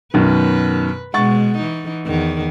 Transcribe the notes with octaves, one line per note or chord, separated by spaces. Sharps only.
F#2 B2 D#3 B4
B2 G#3 F#5 C#6 A6
E3 D#4
E2 D#3